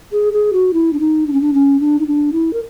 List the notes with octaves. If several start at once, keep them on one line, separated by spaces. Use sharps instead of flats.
G#4
G#4
F#4
E4
D4
D#4
D4
C#4
D4
C#4
D4
D#4
D4
E4
A#4